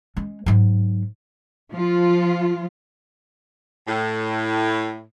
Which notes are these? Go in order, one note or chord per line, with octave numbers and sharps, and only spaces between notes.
G#3 C#4
G#2 F#3
F3 F4
A2